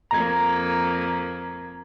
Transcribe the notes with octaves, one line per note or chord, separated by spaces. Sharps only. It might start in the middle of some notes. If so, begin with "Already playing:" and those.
F2 A#3 A#5 G#6